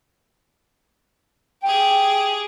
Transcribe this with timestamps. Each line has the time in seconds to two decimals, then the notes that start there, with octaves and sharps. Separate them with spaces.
1.63 G4 G#4 G5